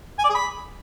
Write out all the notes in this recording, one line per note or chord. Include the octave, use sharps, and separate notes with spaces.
G#5
D5
G#4
B5